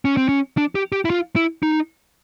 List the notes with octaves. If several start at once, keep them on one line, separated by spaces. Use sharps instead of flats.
C#4
C4
C#4
D4
G4
G4
E4
F4
E4
D#4